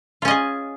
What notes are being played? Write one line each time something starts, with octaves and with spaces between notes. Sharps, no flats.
C#4 F4 G#4 D#5